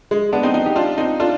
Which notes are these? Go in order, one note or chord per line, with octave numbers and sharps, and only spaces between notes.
G#3
B3 D4
C4 D#4
C4 D#4
G4
D4 F4
C4 D#4
D4 F4